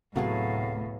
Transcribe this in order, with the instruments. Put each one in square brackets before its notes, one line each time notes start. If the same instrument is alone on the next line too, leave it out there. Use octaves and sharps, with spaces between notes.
[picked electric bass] D1 C3 A3 [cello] A2 [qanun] F#3 B3 G#4 [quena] F5